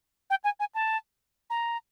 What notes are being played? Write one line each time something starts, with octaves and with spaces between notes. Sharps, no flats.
G5
G#5
G#5
A5
A#5